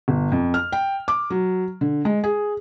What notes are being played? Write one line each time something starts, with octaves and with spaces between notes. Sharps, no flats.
G1
F2
F6
G5
D6
F#3
D3
G#3
G#4